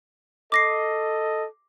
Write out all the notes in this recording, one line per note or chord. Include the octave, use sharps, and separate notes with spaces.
A4 D#5 D6 A#6 C7